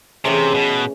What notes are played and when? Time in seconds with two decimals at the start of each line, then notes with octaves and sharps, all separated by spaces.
0.24 C3 E3 A3 C#4 F4 G#4
0.54 B2